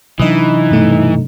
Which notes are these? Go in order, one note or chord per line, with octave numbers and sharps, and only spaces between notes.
C3 E3 F#3 D4 D#4 D#5 B5 D#6
G2 B2 A3